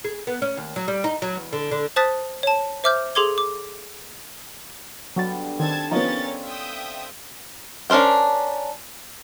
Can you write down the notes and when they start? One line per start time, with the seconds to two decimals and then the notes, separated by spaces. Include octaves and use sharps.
0.05 G#4
0.27 B3
0.42 C#4
0.57 D#2
0.76 F#3
0.88 G3
1.04 D#4
1.22 F#3
1.36 E2
1.53 D3
1.71 D3
1.96 C5 A5 D#6 F#6 A6 B6
2.43 C#5 A5
2.84 C5 E5 D6 F6 G6
3.15 G#4 A4 C6 D6 G#6 G7
3.38 D6
5.16 B2 D3 F#3 G3 F#4 A6
5.60 D#3 C4 D4 A4 A5 G#6
5.91 F3 B3 C#4 D#4 A#4 D#5 A6
6.44 E5 F5 G5 D#6
7.90 C#4 D4 A#4 C5 G5